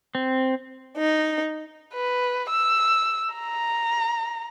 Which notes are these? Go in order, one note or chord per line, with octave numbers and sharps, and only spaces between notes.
C4
D#4
B4
E6
A#5